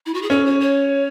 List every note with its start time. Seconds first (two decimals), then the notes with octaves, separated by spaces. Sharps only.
0.06 E4
0.14 F#4
0.22 G#4
0.30 C#4 A4
0.46 C#5
0.60 C#5